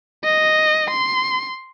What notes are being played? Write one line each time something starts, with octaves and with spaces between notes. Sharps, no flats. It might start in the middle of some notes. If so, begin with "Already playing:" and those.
D#5
C6